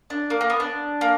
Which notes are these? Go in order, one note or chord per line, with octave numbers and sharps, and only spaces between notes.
D4
A#3
A#3
B3
D4
A#3